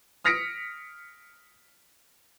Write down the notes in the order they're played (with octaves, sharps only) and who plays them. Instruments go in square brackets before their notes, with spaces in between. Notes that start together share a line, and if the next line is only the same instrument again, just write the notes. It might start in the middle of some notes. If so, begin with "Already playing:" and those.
[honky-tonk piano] D#6 F6 A#6 B6 C#7 D7